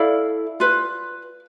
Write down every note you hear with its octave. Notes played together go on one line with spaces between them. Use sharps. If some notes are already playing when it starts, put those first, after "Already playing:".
Already playing: E4 A4 D5 F5
F4 B4